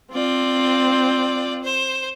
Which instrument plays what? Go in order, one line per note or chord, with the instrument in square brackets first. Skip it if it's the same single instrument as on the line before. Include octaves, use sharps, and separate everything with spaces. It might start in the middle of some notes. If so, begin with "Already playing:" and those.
[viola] C4 [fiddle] F4 D5
[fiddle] C5